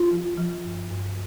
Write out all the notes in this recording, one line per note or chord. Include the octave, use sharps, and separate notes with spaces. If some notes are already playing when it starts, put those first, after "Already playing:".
Already playing: F4
F3
F3
G2
G2